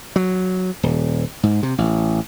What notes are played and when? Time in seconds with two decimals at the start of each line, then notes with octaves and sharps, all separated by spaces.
0.16 F#3
0.83 D#1
1.43 G#2
1.63 C3
1.78 A1